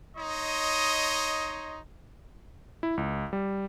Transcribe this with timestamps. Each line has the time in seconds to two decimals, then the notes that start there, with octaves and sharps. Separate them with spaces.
0.17 D#4 C#5 D#5 C6 D#6
2.83 E4
2.97 C#2
3.33 G3